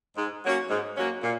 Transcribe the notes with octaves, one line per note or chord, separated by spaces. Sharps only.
G#2
F#3 A#3 C#4 F#4
G#2
F#3 A#3 C#4 F#4
A#2